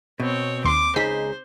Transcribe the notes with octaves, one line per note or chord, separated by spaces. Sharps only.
B2 C4 C#5
D#2 C6 D6
C#2 D#4 G#4 C5 B6